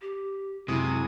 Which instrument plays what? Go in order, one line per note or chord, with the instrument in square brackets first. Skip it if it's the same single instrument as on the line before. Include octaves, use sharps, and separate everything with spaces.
[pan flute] G4
[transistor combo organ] F#2 G#3 D#6 [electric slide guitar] C3 [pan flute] E4